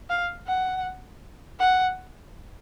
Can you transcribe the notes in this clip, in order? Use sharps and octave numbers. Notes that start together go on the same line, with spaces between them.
F5
F#5
F#5